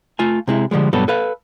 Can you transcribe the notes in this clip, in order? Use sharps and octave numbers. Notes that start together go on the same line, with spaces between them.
A3 F4 G#5
C3 G#3 E4
D3 F3 G3 G#3
G2 B2 F#3 G3 B3 A4
A4 B4 F5